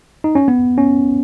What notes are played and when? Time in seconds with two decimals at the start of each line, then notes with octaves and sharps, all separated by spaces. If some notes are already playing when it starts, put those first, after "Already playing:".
0.24 D#4
0.35 C#4
0.48 B3
0.78 C#4